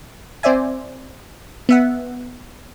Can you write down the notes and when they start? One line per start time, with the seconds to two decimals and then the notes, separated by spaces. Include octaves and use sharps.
0.43 C4 C5 D5 E5 G#5
1.69 B3 E5 F#5